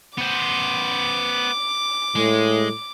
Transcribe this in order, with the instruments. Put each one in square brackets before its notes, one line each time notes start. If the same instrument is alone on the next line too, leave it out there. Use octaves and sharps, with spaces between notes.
[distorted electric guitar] B3 C5 [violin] D6
[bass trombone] A2 [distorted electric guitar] G#3